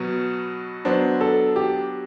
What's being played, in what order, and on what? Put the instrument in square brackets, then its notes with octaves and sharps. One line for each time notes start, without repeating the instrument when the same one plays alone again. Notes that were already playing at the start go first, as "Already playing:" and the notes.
Already playing: [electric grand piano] B2 F#3 B3 F#4
[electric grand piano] F#3 B3 D4 [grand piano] C5
[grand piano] A4
G4